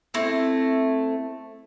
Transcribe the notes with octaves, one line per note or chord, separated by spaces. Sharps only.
A3 C4 E4